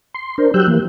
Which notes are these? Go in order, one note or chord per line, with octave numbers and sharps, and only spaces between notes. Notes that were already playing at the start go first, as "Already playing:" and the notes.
C6
D4 A#4 C5
F#3 G4 E6 F#6 G6
E3 A#3